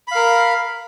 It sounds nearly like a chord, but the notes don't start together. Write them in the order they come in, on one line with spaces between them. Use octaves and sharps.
B5 F5 A#4